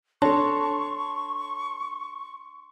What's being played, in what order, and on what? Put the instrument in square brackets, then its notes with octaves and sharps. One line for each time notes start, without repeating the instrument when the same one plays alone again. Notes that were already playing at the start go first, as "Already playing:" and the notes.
[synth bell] D4 A4 [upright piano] C#5 A5 [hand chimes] C6 [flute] C#6